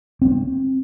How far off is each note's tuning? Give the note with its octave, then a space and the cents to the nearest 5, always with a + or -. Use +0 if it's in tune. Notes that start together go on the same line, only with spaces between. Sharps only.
C4 +15